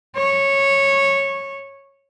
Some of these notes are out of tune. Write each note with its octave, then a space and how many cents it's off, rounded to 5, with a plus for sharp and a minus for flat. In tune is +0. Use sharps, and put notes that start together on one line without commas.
C#5 -10